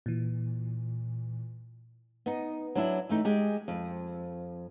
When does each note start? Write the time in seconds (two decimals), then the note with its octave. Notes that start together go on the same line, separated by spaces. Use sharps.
0.06 A#2 E3
2.26 B3 D#4
2.75 F#3 D4 E4
3.09 E3 A3 D#4
3.25 G#3 G4 G#4
3.68 F2